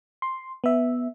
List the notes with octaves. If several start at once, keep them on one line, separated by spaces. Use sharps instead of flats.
C6
B3 E5